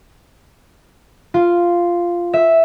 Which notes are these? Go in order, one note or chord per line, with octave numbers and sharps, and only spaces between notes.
F4
E5 E6